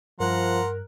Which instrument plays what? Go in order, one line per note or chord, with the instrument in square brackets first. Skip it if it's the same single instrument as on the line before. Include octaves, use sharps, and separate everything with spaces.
[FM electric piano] G2 F#6 [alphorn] F3 [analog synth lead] A#4 [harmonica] F#5 A#5 C6